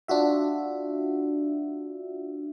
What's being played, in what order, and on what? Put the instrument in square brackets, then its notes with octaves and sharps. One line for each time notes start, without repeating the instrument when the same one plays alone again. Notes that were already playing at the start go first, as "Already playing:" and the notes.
[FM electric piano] D4 F4 F#4 E5